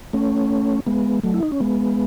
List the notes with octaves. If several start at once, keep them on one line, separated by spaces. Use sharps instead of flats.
A3 C#4
G#3 B3
F#3 A3
E4
D#4
C#4
G#3 B3